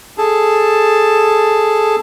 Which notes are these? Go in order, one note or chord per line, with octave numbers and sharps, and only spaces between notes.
G#4 A4 A5